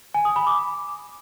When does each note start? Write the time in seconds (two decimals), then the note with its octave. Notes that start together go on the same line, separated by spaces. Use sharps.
0.14 G#5
0.25 D#6
0.36 B5
0.47 D6